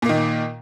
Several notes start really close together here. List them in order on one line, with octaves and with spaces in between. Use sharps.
A#2 A#3 D#3